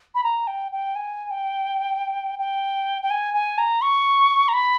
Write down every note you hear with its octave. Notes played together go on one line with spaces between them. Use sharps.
B5
A#5
G5
G5
G#5
G5
G5
G5
G#5
G#5
A#5
C#6
A#5
B5